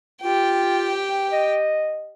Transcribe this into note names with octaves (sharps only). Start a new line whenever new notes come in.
F4 G4 G5
D#5